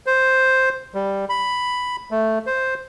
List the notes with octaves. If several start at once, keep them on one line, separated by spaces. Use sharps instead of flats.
C5
G3
B5
A3
C5